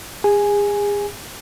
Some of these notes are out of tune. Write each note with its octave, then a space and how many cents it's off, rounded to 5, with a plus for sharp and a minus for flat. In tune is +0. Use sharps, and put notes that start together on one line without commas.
G#4 -35 G#5 +0